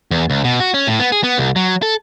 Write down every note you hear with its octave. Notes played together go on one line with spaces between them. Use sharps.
E2
C#2
B2
F#4
C#4
A2
B3
G#4
B3
C2
F#3
A4